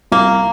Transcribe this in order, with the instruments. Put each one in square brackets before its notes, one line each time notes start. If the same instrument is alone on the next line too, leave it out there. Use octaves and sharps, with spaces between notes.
[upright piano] C2 [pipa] A#3